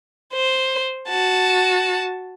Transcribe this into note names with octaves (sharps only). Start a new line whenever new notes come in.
C5
F#4 A5